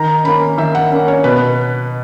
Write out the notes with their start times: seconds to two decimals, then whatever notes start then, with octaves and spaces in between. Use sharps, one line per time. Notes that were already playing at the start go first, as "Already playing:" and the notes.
Already playing: D#3 A#5
0.24 A#3 C#4 B5
0.58 D#3 E5
0.75 F#5
0.91 A#3 C#4
1.08 C#5
1.24 B2 B4